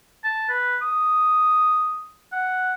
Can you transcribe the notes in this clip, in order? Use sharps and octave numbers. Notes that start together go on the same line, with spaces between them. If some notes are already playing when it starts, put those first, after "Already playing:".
A5
B4
D#6
F#5